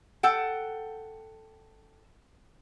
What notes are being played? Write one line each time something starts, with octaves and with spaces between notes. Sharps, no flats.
A4 F#5 G5